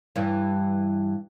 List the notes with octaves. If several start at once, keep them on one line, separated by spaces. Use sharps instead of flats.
G2 E3